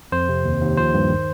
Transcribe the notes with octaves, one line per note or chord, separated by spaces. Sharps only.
F2 C5
C3
D#2
D#2
F3 C5
G2
D#3